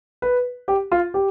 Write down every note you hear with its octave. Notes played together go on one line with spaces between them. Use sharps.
B4
G4
F4
G4